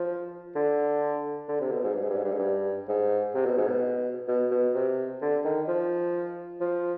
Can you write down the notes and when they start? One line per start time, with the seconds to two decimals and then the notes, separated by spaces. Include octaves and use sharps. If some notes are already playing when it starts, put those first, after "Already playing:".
Already playing: F3
0.56 D3
1.48 D3
1.61 C3
1.72 B2
1.84 G#2
1.95 G2
2.02 G#2
2.10 G2
2.17 G#2
2.24 G2
2.32 G#2
2.38 G2
2.89 G#2
3.34 C3
3.46 B2
3.57 G#2
3.68 B2
4.28 B2
4.51 B2
4.74 C3
5.22 D3
5.45 D#3
5.68 F3
6.61 F3